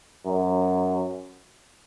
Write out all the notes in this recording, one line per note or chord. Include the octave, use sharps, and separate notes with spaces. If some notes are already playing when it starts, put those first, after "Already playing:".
F#2